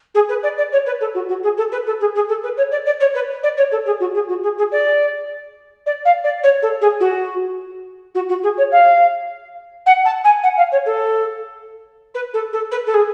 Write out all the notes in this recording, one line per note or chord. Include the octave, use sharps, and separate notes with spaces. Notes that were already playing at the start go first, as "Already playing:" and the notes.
G#4
B4
D5
D5
C#5
B4
A4
F#4
F#4
G#4
A4
B4
A4
G#4
G#4
A4
B4
C#5
D5
D5
C#5
B4
D5
C#5
A4
G#4
F#4
G#4
F#4
G#4
G#4
D5
D5
F5
D5
C#5
A4
G#4
F#4
F#4
F#4
G#4
C#5
F5
F#5
A5
G#5
F#5
F5
C#5
A4
B4
A4
A4
B4
A4
G#4